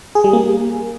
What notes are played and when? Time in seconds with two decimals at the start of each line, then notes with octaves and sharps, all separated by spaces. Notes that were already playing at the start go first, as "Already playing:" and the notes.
0.15 G#4
0.24 G3
0.33 A#3